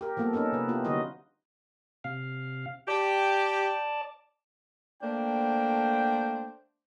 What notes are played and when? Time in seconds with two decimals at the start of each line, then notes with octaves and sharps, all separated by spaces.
0.01 G4 A#4
0.17 F3 G3 A#3 B3 A4
0.33 C#4 D#4 A4 A#4
0.52 C3 B4
0.69 B3 E4 F4 G4
0.85 D3 F#3 G3 D#4 F#4 D#5
2.04 C3 F5
2.88 G4 D5 A5
5.02 A3 A#3 D4 C5 G5